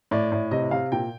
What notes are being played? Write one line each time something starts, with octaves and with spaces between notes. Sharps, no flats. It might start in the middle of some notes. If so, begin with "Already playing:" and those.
A2 D5
A2
C3 D#5
C3 F5
A#2 G5